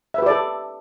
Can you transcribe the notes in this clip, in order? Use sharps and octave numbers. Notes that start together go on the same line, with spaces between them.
G4 A4 B4 D5 E5